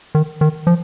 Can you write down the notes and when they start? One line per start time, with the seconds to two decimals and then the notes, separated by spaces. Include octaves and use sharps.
0.15 D#3
0.41 D#3
0.67 F3